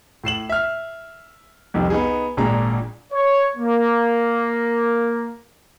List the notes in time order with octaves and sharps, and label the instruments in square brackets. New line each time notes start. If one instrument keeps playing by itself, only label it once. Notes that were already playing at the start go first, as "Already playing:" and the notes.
[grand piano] A2 C7 E7 F#7
E5 F6
C2 F2 D#3 F3
B3 D#4 G#4
G#1 A#2 D4 G#4 A#5
[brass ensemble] C#5
A#3